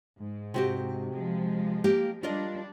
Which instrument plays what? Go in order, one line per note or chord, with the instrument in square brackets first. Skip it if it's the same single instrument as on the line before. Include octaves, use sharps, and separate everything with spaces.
[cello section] G#2
[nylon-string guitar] C3 F#4 G4
[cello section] F3 G#3
[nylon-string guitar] A#3 G4
[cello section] G3 D4 [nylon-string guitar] F4 A#4 D#5